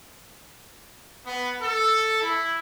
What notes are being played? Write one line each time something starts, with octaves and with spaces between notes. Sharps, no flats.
B3
A4
E4